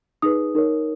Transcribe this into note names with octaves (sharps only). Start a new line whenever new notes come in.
D#4 G#4 B4 D#6
D#4 A#4 C#5